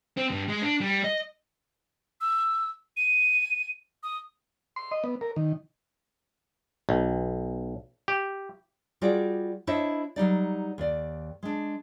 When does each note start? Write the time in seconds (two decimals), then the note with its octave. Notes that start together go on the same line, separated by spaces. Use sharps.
0.17 C4
0.30 G2
0.48 G#3
0.62 D4
0.81 G3
1.04 D#5
2.21 E6
2.97 D#7
4.03 D#6
4.76 C6
4.91 D#5
5.04 B3
5.21 A#4
5.36 D#3
6.89 B1
8.08 G4
9.01 G3 F4 F#4 G#4 D5
9.67 D4 E4 C5 C#5 D#5 E5
10.16 F#3 G3 D#4 D5
10.78 D#2 D5
11.43 G#3 D4